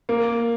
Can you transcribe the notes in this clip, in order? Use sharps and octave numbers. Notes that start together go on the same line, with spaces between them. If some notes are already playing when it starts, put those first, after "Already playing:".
A#3